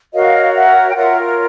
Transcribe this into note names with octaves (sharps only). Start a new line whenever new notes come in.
F#4 A#4 C#5 D#5 F5
E5 F#5
G5
F4 A#4 C#5 E5 F#5